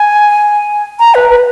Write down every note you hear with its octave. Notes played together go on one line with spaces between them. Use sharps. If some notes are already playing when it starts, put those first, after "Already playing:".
Already playing: G#5
A#5
B4
B4